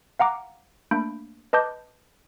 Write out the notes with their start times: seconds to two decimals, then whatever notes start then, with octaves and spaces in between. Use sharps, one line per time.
0.19 F5 F#5 A#5 D6
0.91 A3 A#3 D4 B5 G6 D7
1.53 B4 D#5 A5 D6 G6